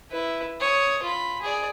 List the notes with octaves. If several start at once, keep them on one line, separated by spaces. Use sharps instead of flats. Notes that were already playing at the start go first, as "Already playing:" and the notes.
E4 B4
C#5 D#6
F4 B5
G#4 D5